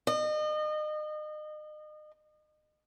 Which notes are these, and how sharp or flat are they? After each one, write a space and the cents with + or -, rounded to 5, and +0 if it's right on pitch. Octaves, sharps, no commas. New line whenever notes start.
D#5 -35